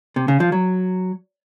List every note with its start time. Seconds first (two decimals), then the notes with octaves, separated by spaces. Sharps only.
0.16 C3
0.28 C#3
0.40 F3
0.52 F#3